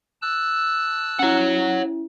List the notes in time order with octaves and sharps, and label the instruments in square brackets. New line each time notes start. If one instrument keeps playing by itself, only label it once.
[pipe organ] A5 E6 F#6
[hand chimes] C#4 E4 [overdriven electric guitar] C#5 F#5